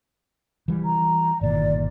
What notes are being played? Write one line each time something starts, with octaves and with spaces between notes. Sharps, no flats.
E3 G3
A#5
G1 A#2 D#3 D5